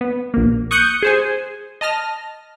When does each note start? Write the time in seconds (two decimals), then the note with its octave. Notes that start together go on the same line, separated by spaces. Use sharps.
0.01 B3
0.34 A#1 A#3
0.71 C#6 D#6 F#6 G6 C#7
1.02 G#4 C5 G#5
1.81 D#5 A5 F6 A#6